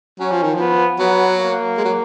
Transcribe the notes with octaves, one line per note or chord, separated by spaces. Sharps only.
F#3 C#4
F3
D#3
F3 B3
F#3 B3
A#3
G#3
F#3